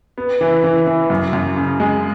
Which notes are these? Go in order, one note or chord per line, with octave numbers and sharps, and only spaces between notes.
B3
E3
E3
E3
F#2
F#2
C#3
G#3